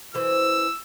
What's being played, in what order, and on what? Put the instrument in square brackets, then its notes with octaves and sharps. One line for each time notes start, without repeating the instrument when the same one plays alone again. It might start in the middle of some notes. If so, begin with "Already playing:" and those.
[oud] F#2 E3 C5 [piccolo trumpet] E6